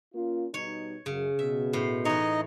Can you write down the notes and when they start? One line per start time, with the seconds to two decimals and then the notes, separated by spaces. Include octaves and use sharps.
0.15 A#3 C#4 F4
0.54 B2 G3 D#4 C#5
1.06 F#2 C#3
1.39 B2 E5
1.73 A2 C5
2.05 E3 D#4 C#5 D#5